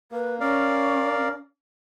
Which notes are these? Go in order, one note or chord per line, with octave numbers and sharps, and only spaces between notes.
A#3 B4
C#4 A#4 D5 F5